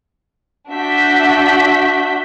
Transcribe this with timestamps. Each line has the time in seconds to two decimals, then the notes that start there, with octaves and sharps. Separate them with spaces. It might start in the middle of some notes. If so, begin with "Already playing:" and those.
0.71 D4 F#4 E5 G6 B6